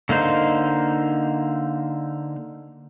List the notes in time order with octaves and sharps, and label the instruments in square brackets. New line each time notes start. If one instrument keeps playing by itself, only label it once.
[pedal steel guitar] D3 A#3 D#4 C5